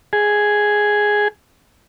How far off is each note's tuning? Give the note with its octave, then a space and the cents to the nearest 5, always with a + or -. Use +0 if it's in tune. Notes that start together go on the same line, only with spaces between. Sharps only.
G#4 +0